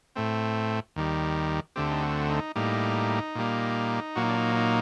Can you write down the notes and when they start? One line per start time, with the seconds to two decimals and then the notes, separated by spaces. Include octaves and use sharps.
0.16 A2 A3 C4
0.96 D#2 D#3 G3
1.76 D2 D3 A3 C4 G4
1.91 D#4
2.03 F#4
2.29 D#4
2.55 A2 G3 A#3 D#4
3.35 A#2 G3 A#3
4.15 A#2 F#3 A#3 F#4
4.23 D#4
4.29 D4
4.37 D#4
4.56 D#4